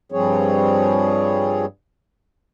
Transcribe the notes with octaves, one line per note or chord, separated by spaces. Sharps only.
G2 F3 G3 C4 G#4 C#5